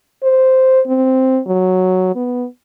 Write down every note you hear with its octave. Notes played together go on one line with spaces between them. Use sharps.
C5
C4
F#3
B3